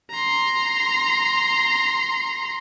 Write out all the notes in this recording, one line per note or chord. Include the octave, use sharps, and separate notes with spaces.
A#5 C6